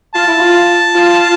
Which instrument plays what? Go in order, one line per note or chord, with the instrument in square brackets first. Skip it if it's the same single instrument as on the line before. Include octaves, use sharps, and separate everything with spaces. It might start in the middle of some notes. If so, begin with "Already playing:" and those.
[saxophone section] F4 [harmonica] A5
[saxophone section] E4
F4
F4